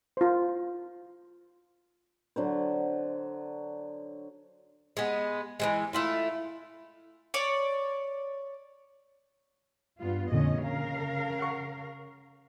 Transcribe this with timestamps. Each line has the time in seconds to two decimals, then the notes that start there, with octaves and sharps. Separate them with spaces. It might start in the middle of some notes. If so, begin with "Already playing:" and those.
0.17 F4 C5
2.36 D3 F#3 C5
4.97 G#3 B3
5.60 E3 F3 G#3
5.93 A3 E4 F4
7.34 C#5 D5 D6
10.00 G2 B3 F4
10.32 F2 A#2 D3 C#4 D#5
10.62 C#3 A#4 F5
11.39 F#5 C#6